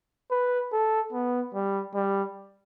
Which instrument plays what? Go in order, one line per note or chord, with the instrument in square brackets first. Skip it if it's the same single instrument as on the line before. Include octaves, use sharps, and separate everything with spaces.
[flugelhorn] B4
A4
B3
G3
G3